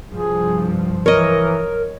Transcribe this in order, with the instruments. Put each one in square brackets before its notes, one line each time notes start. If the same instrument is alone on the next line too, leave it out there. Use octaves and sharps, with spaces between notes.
[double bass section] C2 G2 F3 [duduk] G#4
[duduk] E3 [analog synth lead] A#4 [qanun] C#5 D#5